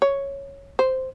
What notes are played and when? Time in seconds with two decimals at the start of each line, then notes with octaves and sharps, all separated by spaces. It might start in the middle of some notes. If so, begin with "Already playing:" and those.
0.02 C#5
0.79 C5